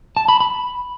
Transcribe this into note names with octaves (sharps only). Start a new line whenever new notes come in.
A5
B5
B5